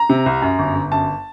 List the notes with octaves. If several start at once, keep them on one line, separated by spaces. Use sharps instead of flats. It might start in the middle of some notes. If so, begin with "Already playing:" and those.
Already playing: A#5
C3
C2
F#2
G1
G1
F#2 A5